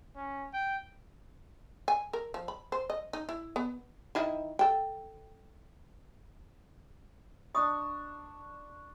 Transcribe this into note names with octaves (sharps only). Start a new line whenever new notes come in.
C#4
G5
G#5
A#4
F3
B5
C5
D#5
D#4
E4
B3
D#3 E4 D#5
A4 G5
D4 D#5 C6 C#6 D#6